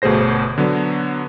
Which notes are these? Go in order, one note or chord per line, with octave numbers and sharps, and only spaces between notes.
G1 B2 A3 G#4 C5 A#6
D3 F#3 B3